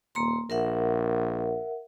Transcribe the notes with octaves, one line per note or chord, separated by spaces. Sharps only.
D#1 A#3 A#5 C6
A#1 A#4 E5 F#5